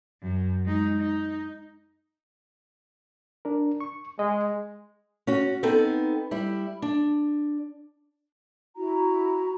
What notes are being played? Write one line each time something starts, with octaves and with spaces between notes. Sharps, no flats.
F#2
G#3 D#4
D#4
D4 A#4
C#6
G#3 D#5
C#4 F#4
B3 C4 D#4 A4
G3 E4
D4
E4 F#4 A#5